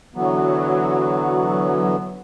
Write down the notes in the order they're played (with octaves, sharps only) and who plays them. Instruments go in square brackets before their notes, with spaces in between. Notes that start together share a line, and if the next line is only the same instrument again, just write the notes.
[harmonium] D3 E3 B3 [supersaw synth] F#3